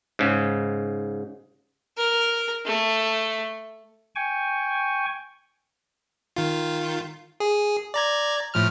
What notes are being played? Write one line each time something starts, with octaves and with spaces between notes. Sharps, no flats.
G#2 C#3
A#4
A3
G5 G#5 C#6
D#3 F4
G#4
D5 A#5 G#6
A2 F3 F6